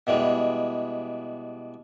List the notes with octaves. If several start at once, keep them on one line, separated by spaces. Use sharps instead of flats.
B2 E3 G3 G#3